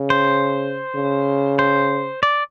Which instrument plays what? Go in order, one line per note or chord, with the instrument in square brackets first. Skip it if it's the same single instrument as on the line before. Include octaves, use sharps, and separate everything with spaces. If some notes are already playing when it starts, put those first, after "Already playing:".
Already playing: [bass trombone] C#3
[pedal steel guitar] C5
[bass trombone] C#3
[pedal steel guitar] C5
D5